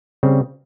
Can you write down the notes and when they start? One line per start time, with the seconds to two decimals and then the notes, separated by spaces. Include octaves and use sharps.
0.23 C#3 G3 C4